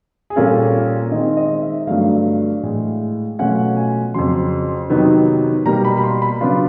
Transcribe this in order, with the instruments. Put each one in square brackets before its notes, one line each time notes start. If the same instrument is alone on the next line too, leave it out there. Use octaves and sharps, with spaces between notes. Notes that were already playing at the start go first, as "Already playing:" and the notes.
[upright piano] G#4
A#2 G3 A#3 C#4 F4 A4
D#3 G#3 C4 D#5
D#5
E5
G2 D3 F#3 A3 F5
A2 E3 G#3
B2 F#3 A3 C#4 F4 F#5
G#5
F2 C#3 F#3 C6
C3 D#3 F#3 B3 D#4
B2 G3 A#3 A#5
B5
B5
C6
B5
C#3 F#3 B3 D4 F4 C6